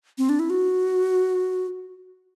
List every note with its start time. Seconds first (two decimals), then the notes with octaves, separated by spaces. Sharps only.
0.18 C4
0.29 D4
0.39 E4
0.50 F#4